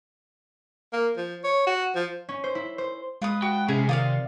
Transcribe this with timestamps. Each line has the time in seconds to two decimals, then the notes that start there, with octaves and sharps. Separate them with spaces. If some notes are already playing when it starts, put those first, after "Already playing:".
0.93 A#3
1.17 F3
1.44 C#5
1.67 F#4
1.96 F3
2.29 C#4
2.44 C5
2.55 E4
2.78 C5
3.22 G#3 F4 B4 D#6
3.42 F#4 G5
3.68 C3 C#4 E4 G#4 G#5
3.89 D#3 F4 D5 F5 D#6